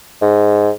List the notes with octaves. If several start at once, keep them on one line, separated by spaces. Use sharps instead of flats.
G#2